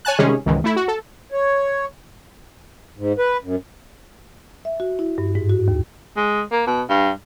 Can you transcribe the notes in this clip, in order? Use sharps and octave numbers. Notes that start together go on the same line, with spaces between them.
C#5 G#5 A5 F#6
C3 D#3 G3 G#3 C#4 G#4
C#2 G#2 D#3 E3
A3 E4
F#4
A4
C#5
G#2
B4
F#2
E5
F#4
E4
G2
G#2
F#4
D#2
G#3
A#3
B2
G2